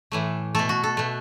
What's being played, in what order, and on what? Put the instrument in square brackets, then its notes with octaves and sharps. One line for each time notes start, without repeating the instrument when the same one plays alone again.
[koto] A2 E3 A3
B2 A3 A4
F#4
A4
B2 A3